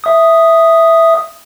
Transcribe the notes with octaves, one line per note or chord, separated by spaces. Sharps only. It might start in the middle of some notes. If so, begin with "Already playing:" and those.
E5 D#6